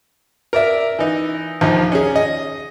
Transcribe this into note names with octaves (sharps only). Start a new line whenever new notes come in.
A#4 D5 E5
E3 D#4
A#1 D#2 F3
C#4 G#4
D#5